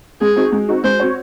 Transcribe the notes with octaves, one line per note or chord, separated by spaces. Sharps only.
G#3 G#4
C4 D#4 F#4
G#3
C4 D#4 F#4
G#3 C5
C4 F#4 C#5